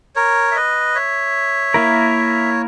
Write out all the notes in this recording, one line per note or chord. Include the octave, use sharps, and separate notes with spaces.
A#4 C#5
E5
B4 D#5
C#5 E5
A#3 E4 A#4